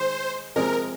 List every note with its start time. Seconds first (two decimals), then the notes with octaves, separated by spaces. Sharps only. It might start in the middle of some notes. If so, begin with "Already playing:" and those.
Already playing: D#3 G#3 C5
0.56 C3 F3 G#3 C4 G#4 A#4